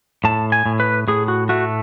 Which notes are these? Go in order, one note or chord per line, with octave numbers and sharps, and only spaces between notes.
A2 A5
G#5
A2
B4
A2 G#4
F#4
A3 F#4